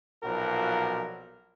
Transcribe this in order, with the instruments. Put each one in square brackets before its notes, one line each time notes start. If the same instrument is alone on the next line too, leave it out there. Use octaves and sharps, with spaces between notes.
[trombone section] B1 A#2 F3 F#4 A#4